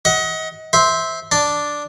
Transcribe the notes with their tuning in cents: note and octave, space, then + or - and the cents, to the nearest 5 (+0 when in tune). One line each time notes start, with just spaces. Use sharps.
D#5 +30 F#5 +0
C5 +0 E5 -15
D4 +0 A5 +0